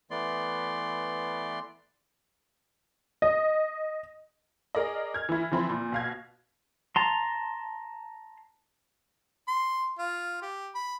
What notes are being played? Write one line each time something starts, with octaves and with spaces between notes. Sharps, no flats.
E3 A3 B3 D5 C6
D#5
G#4 A#4 D5 D#5
F6 G#6
E3 E4
E3 F3 C4 E5 B5
A#2
B2 F5 G#6
A5 A#5 C6
C6
F4
G4
B5